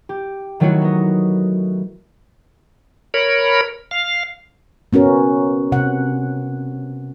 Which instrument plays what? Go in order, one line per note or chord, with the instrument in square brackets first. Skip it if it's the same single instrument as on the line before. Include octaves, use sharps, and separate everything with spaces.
[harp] G4
D#3 F#3 A3 E4 F#4
B3 D#5
[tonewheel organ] A#4 C#5 B5
F5
[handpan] B3 C#4 F#4 A#4
C3 F#5